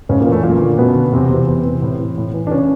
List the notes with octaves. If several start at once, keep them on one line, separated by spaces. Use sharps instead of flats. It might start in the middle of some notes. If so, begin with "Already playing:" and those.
G#2 C#3 C#4
A#2 A#3
E3
A3
F#2 A#2 A#3
D3
F#2 B2 B3
D3
E2 C3 C4
C3 E3
E2
C3 E3
A2
E3
A2
E3
D4
C#3 C#4